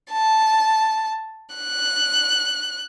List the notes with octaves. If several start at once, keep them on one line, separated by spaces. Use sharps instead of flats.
A5
F#6